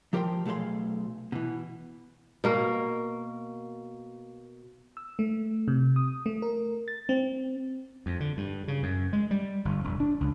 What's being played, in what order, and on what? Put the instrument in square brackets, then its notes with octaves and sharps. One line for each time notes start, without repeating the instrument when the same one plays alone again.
[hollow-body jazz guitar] F3 G4 A#4 C5 G5 C6
B1 A3 G#4 F5 C6
B2 E3
[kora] B2 A#3 A#4
[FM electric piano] E6
A3
C3
D#6
A3
A#4
A6
C4
[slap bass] F2
D3
G2
C#3
F#2
G#3
G3
G1
E1
D4
C#2